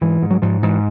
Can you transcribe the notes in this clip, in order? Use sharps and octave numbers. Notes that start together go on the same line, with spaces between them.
G#2 E3
G#2
F#3
G#2 F3
G#2 E3